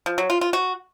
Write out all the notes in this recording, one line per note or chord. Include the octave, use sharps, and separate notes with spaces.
F3
F#3
F4
F4
F#4